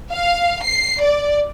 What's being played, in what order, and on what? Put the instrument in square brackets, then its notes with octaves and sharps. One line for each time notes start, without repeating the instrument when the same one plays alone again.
[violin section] F5
C7
D5